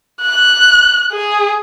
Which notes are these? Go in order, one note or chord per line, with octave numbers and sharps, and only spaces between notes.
F#6
G#4